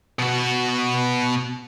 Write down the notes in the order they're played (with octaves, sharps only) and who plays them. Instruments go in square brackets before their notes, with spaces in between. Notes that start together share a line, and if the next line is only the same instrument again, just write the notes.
[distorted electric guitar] B2 F#4